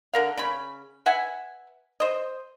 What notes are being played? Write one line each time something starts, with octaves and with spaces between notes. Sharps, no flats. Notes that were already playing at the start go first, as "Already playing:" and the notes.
D3 A#4 F5
C#3 C#4 B5
B4 E5 F#5 G#5
C5 D#5